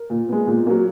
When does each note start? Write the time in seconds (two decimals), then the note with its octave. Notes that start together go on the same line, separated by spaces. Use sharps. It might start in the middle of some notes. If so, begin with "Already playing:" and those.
Already playing: A#4
0.10 A#2
0.29 G#3 B3
0.47 A#2
0.67 F#3 A#3